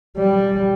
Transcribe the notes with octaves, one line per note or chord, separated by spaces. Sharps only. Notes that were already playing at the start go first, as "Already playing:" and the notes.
G3